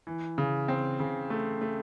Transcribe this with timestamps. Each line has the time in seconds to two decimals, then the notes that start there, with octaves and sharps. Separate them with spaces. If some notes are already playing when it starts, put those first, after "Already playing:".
0.07 E3
0.38 C#3
0.68 C4
1.00 C#3
1.30 A3
1.61 A3